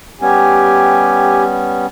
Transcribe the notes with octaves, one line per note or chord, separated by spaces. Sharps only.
G3 B3 C#4 G4 G#5